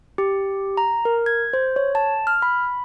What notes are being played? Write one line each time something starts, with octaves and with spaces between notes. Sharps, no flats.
G4
A#5
A#4
G#6
C5
C#5
A5
F6
B5